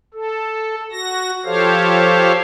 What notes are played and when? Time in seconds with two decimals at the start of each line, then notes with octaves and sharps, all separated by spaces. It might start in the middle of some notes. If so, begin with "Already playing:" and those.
0.14 A4
0.92 F#4 A#6
1.45 F3 G4 A4 C5 C#5 F5